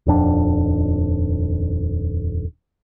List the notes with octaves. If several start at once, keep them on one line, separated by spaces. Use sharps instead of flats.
D#1 F2 D4